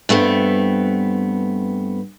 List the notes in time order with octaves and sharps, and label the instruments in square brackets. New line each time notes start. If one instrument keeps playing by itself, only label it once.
[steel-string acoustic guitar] G2 A3 B3 C4